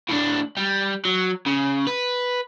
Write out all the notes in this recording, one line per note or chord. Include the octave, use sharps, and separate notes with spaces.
A2 D4
G3
F#3
C#3
B4